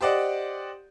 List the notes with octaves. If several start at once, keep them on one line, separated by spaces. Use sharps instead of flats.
G4 C5 D5 D#5 F#5